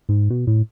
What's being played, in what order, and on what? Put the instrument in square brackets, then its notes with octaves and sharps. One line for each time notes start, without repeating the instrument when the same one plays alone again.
[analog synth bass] G#2
B2
A2